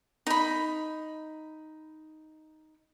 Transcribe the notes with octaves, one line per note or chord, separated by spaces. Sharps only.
D#4 B5